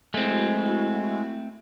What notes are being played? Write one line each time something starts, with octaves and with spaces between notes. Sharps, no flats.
G#3 A3 C4 E4 F#4